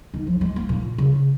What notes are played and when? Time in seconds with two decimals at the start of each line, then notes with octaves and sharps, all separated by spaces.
0.14 D#3
0.27 F3
0.41 G#3
0.56 A#3
0.69 A#2
0.98 C#3